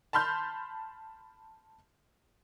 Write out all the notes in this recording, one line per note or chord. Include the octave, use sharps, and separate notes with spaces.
A5 B5 C6 F6 G6